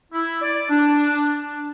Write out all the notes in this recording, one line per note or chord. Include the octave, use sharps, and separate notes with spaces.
E4
D5
D4